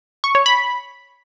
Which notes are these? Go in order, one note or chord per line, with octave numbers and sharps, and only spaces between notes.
C#6
C#5
B5